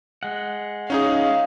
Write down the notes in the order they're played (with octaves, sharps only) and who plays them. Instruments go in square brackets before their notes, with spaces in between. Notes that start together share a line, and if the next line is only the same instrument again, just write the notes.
[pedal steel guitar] G#3 F#5
[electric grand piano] C#4 D#4 G#4 [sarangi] F5